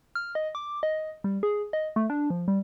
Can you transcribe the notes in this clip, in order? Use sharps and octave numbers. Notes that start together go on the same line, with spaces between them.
F6
D#5
D6
D#5
G3
G#4
D#5
A3
D4
F3
G3